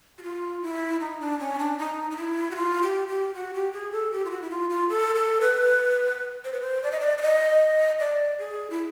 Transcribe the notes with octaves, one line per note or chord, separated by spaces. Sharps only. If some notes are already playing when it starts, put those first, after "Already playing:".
F#4
F4
E4
D#4
D4
C#4
D4
D#4
D#4
E4
F#4
F4
G4
G4
F#4
G4
G#4
A4
G4
F4
F#4
E4
F4
F4
A4
A4
B4
C5
B4
C5
D5
D#5
D5
D5
D#5
D5
G#4
E4